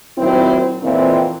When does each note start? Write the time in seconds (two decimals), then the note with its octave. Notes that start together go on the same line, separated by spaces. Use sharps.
0.18 A#2 D#3 F#3 C4 E4 C5
0.83 F2 A#2 E3 C4